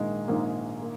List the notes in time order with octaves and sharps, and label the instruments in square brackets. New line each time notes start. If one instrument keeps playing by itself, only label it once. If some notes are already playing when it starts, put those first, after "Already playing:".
Already playing: [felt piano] A#1 G#2 D#3 A#3 [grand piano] G#3
[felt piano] A#1 G#2 D#3 A#3
[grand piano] A#3